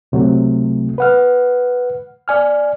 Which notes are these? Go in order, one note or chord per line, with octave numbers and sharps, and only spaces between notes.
C#2 C3 F#3 A3
B4 F#5 F6
D5 G#5 F6